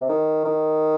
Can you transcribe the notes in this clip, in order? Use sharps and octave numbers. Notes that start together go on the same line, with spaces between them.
C3
D#3
D#3